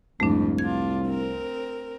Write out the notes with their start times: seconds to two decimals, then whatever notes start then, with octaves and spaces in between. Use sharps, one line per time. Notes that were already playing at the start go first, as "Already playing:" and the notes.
0.20 C2 F2 G#2 A3 D4
0.58 D4 F4 G#6
1.05 C4 A#4